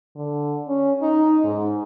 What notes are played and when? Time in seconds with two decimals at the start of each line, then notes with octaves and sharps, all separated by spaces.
0.15 D3
0.68 C#4
1.02 D#4
1.44 G#2